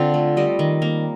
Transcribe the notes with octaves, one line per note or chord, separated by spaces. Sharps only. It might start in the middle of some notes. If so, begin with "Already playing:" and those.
Already playing: D3 C4 F4
A3
G3 D#5
D#3
A#3